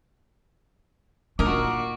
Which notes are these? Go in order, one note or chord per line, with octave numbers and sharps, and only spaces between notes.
A#2 D4 D#4 F#4 A#4 D6